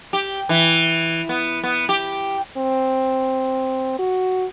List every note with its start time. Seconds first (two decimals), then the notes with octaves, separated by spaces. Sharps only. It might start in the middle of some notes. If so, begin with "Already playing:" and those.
0.13 G4
0.49 E3
1.29 B3
1.63 B3
1.89 G4
2.57 C4
3.99 F#4